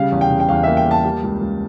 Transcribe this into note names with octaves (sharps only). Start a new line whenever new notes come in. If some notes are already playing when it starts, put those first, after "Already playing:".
Already playing: C#3 G3 F5
E2
G5
C#3
G5
E2 F5
A#3 E5
G5
A#3
A5
G3
C#2
C#2